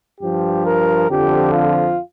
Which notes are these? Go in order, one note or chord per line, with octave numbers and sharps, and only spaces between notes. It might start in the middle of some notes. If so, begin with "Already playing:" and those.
G2 F3 G4
A#4
F2 D3 F3 G4
F4